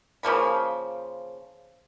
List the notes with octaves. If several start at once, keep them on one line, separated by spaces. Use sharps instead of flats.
C#3 F3 A#3 B5